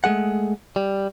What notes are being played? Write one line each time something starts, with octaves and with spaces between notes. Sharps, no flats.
G#3 A3 G#4 F#5
G3